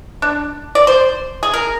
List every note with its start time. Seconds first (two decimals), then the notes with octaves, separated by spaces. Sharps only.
0.22 D4
0.75 D5
0.87 C5
1.43 G#4
1.54 A#4